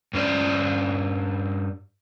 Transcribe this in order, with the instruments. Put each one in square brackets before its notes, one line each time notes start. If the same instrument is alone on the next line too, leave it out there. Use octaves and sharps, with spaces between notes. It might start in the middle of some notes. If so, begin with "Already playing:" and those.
[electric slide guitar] G2 C#4 C5 D5